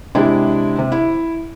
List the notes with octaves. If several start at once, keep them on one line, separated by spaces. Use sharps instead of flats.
C3 G#3 D4 E4 G4
C3
E4